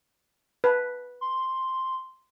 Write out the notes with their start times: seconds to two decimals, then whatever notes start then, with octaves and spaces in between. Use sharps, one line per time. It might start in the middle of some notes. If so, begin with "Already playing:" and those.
0.64 B4
1.21 C6